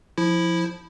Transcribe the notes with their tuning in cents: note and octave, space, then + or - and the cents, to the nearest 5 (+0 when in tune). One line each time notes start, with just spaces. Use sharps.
F3 +0 E4 +0